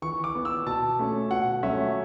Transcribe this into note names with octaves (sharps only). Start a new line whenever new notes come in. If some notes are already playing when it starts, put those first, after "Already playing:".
E3 C#6
D6
B3
E6
B2 A5
A3 C#4
B2 F#5
F#3 A3 C#4 E5